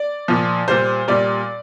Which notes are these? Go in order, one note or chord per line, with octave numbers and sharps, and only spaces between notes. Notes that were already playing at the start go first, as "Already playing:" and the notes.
Already playing: D5
A#2 F3
A#2 G3 C5
A#2 G3 D5